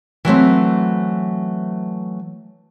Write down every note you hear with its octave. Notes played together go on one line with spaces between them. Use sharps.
E3 F#3 A3 C4